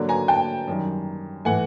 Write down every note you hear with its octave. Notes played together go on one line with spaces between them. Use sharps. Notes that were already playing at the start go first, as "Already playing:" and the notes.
Already playing: D3 F#3 A#3 D4
G#5 A#5
G5 A5
F#2 D#3 G3
A2 E3 A3 F#5 G#5